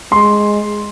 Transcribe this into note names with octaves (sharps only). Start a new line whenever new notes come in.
G#3 C6